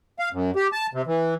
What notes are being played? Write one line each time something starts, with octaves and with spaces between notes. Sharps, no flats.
F5
F#2
G4
A5
C3
E3